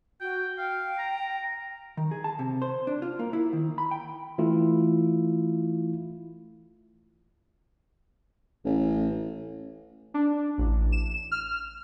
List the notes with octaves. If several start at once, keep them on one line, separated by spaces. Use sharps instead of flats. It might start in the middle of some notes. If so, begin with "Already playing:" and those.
F#4 G5
F5 G5
A#5
D#3
G#4
A5
C3
C5
D4
F4
A#3
E4
D#3
B5
G5
E3 A3 E4 F4
A1
D4
A1
E7
F6